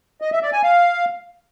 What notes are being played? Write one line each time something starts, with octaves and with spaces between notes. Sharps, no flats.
D#5
E5
D5
G#5
F5